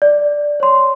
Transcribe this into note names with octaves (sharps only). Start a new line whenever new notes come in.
D5
C#5 C6